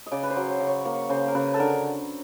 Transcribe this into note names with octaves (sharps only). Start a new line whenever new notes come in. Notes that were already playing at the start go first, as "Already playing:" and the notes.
D#5
C#3 D5
B4
C5
F#3
C5
C#3
C#5
A#3 C#5
C#3 C5
A#4
C#3 B4
A4
D3 A#4